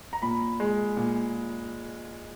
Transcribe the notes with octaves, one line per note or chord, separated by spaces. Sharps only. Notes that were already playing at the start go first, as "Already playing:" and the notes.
A#5
A#2 B5
G#3
A#2